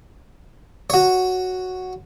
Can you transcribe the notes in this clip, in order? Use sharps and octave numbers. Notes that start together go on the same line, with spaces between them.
F#4 C#5